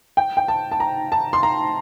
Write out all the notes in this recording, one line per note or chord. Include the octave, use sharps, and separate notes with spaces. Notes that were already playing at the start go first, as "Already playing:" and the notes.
G5
G5
A5
A5
A#5
A5
C6
A#5